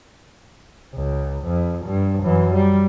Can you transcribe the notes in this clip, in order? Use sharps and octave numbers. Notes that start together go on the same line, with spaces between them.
C#2
F2
G2
F#2 E3
G3